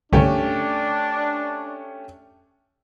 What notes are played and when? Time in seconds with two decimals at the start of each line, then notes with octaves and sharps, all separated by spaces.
0.13 C2 G2 D3 A3 C#4 D4 G4